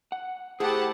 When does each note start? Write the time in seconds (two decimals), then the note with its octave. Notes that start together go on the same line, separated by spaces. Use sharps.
0.12 F#5
0.60 A3 E4 G4 G#4 C5 F#5 A5